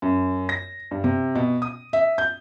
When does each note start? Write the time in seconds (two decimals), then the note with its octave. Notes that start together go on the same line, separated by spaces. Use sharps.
0.02 F#2
0.49 A#6
0.91 G2
1.04 C3
1.35 B2
1.62 D#6
1.93 E5
2.18 G6